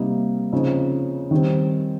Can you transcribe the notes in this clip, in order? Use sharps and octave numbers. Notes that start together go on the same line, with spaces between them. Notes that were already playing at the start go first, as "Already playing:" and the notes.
Already playing: C3 G3 A#3 D#4
C#3 F3 C4 D#4
D#3 G3 C4